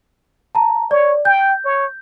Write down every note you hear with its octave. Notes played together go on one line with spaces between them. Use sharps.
A5 A#5
C#5 D5
G5 G6
C#5